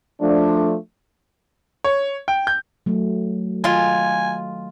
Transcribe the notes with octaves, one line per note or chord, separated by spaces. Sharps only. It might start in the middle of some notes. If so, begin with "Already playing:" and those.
F3 A3 D4
C#5
G5
G6
F#3 A3
D#3 G#3 F4 G#5